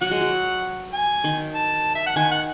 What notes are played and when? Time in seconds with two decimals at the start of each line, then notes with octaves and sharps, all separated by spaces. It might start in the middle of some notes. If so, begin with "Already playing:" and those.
0.01 F#3 F#5
0.11 G#3
0.21 F#3
0.93 G#5
1.24 D#3
1.54 A5
1.95 E5
2.06 F#5
2.16 D#3 G#5
2.31 F#5